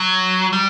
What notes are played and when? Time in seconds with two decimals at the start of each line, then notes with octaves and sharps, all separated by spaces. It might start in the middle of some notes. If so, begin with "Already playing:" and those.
Already playing: F#3
0.53 G3